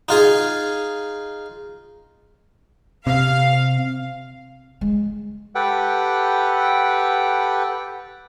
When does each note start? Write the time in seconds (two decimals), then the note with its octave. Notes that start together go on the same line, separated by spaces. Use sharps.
0.09 D#4 F4 G#4
3.07 C3 F5
4.81 G#3
5.55 G4 A4 B4 F#5 G5